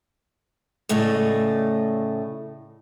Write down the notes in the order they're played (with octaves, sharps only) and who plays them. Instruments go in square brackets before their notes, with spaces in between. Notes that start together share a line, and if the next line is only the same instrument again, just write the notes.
[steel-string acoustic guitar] A2 C#3 A3 D5 D#5